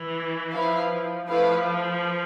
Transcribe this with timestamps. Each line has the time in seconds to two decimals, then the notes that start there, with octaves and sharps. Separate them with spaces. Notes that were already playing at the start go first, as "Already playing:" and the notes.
Already playing: E3
0.54 F3 E4 B4 F5
1.28 F3 A3 E4 B4 F5